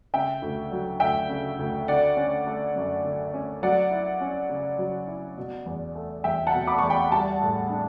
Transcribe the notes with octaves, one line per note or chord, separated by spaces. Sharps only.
C#3 E5 G5
D2
F#3
D2 E5 G5
C#3
D2
D3 D5 F#5
C#4
A3
F#2
D3
C#4
F#3 D5 F#5
E4
C#4
C#3
F#3
E4
B2
E2
A3
E2 E5 G5
F#5 A5
B2
B5 D6
E2 C#6
G5 B5
G3 F#5 A5
A2
D4